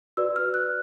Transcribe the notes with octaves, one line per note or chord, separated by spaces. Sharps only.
F#4 B4 D5 E6
F6
F#6